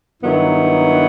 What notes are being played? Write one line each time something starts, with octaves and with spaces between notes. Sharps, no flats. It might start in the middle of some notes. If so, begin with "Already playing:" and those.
G2 D#3 F#3 B3 E4